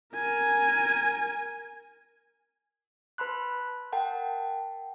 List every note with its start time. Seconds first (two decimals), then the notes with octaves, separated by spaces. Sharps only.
0.15 A#4 G#5
3.18 B4 A5 B5 C6 F#6
3.93 A#4 F#5 G5 A5